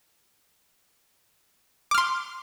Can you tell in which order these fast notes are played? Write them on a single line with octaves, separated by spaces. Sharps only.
D6 F6 C6